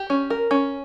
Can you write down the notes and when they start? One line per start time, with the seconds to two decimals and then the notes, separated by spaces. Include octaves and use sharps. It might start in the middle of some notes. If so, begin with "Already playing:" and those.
Already playing: G4
0.10 C#4
0.30 A#4
0.51 C#4